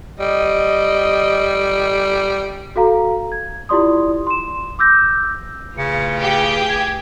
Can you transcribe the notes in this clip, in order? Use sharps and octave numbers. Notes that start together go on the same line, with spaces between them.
G3 D#5
F#4 A4 F5 A#5
G#6
E4 F4 G4 D5 C6 D#6
C6 E7
D6 E6 G6 A#6
A2 C#3 F4 B4 C#7
G4 G#4
G#6